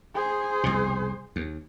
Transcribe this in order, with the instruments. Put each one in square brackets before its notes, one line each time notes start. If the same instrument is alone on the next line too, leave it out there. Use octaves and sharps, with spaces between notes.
[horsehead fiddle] G#4 C5
[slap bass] C2 F2 B2
D#2